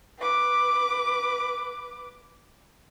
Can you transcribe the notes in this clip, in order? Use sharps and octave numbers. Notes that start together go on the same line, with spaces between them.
B4 D6